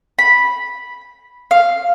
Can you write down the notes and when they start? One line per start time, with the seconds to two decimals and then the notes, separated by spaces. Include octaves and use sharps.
0.19 B5
1.51 F5